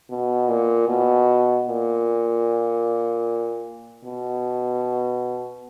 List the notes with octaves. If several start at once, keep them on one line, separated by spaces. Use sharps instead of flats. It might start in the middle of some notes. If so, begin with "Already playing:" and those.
B2
A#2
B2
A#2
B2